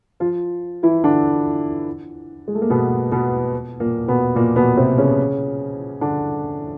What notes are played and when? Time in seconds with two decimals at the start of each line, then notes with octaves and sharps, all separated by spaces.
0.20 F3 F4
0.83 E3 E4
1.04 D3 D4
2.48 G#3
2.55 A3
2.62 A#3
2.70 B2 B3
3.12 B2 B3
3.80 A#2 A#3
4.08 B2 B3
4.35 A#2 A#3
4.56 B2 B3
4.77 C3 C4
4.98 C#3 C#4
6.01 D3 D4